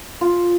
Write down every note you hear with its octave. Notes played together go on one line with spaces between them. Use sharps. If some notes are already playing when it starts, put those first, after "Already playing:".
F4